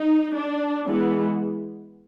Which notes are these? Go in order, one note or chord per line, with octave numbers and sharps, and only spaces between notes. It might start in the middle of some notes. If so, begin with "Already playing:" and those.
Already playing: D#4
D4
E3 G#3 B3